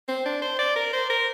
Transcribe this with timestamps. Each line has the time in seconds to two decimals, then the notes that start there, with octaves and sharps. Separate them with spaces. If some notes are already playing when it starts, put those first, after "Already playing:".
0.08 C4
0.25 D4
0.42 C5
0.59 D5
0.76 A#4
0.93 C5
1.10 A#4